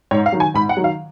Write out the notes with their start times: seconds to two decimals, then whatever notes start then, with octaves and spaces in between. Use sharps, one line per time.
0.11 G#2 C#5
0.26 F5
0.32 D#3 F#3
0.40 G#5
0.54 G#2 B5
0.69 F#5
0.77 D#3 F#3
0.84 F5